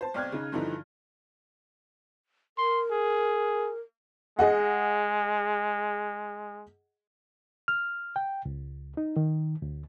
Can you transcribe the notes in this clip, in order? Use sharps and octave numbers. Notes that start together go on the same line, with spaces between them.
C5 A5
B1 C4 D5 F6 F#6 G#6
C#3 D#4
G2 D3 E3 F3 D#4 E4
A#4 C6
G#4
G#3 G#4 D#5 F#5
F6
G5
C#2
D#4
D#3
D2